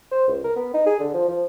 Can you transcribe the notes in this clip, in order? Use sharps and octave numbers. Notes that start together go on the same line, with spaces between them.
C5
C#2
A#4
B3
D#4
G#4
D3
F3
F3